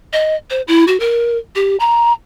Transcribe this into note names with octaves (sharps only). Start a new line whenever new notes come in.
D#5
C5
E4
F#4
A#4
G4
A#5